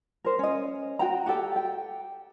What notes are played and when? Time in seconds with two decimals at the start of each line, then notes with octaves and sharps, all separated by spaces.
0.24 A#4 C5
0.39 C#4 D#5
0.99 F#4 G5 A#5
1.26 F#4 G4 A4 G5
1.56 G5